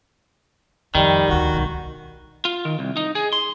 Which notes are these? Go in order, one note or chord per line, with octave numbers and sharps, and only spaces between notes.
F2 D#3 G3
D2 D3 F#4
B1 G3
F4
D#3
C2
D#4
G#4
C6